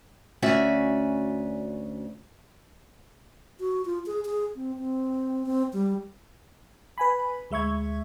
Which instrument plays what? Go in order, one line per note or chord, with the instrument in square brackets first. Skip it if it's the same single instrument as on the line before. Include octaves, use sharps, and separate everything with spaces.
[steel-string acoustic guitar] D2 C#4 F#4 D5 E5 G#5
[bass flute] F#4
F4
G#4
G#4
C4
C4
C4
G3
[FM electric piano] B4 G#5 B5
D2 G#3 E5 C#6 G#6